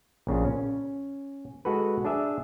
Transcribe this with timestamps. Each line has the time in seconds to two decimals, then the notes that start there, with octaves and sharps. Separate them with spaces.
0.27 A#1 C#3 D4 F4
0.45 C#4
1.65 G#3 F#4 A4 B4
2.05 D4 G#4 D5 E5